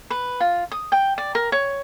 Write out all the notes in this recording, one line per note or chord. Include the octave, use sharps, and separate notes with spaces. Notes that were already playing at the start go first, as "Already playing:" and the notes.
B4
F4
D#6
G5
D5
A#4
C#5